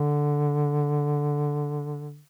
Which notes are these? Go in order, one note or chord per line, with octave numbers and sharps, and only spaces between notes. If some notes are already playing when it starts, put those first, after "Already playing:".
Already playing: D3